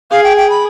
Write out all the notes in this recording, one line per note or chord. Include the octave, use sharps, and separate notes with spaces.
G#4 F5
G5
G5
B5